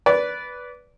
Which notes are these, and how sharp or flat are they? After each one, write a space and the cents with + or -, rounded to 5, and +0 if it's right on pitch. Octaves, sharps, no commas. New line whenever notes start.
B4 -5 D5 -20